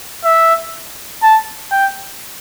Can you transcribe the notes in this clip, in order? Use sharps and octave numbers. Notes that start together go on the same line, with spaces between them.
E5
A5
G5